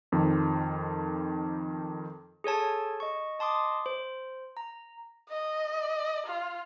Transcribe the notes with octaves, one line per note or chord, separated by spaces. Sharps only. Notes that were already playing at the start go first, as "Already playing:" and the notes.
F2 D#3 F3
G#4 A4 C#5 A5
D#5 C#6
D#5 A5 C6 D6 D#6
C5
A#5
D#5
F4